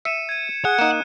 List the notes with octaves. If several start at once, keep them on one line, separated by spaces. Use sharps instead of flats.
E5 C#7 D#7 E7
G#6 D#7
G#4 F#5 F#6
A#3 D#4 E7